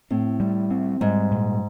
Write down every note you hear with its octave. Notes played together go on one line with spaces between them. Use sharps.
A2 C4
G3
C4
G#2 G3
A#2